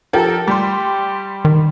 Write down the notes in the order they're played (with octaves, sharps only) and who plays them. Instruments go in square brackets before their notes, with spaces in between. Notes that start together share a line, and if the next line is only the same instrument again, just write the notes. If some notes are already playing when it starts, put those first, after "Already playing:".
[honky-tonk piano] F3 G4 A#4 [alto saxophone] A4
[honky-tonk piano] G3 C6 [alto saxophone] G4
[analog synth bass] D#3